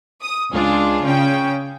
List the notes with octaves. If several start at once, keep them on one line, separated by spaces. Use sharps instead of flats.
D#6
C#2 D4 F4 G#4
C#3 C#4 G5